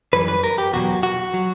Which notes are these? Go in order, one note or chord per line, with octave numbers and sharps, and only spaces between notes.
F#2 E3 G3 B4
B4
A#4
G4
E2 B2 F#3 F#4
F#4
F#3